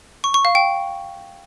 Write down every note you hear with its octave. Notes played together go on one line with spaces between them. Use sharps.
C#6
C#6
F5
G5